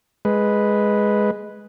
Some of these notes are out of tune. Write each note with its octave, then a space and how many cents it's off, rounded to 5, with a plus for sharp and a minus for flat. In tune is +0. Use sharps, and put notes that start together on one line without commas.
G#3 +0 B4 +0